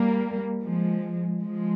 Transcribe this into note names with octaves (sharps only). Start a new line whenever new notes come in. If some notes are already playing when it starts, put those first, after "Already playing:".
Already playing: G3 A#3
F3 G#3
F3 G#3